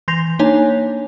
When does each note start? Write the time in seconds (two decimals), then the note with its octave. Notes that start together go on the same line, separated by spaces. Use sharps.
0.08 E3 C6 G6 A#6 C7 F7
0.39 A#3 D4 D#4 C#5 G#5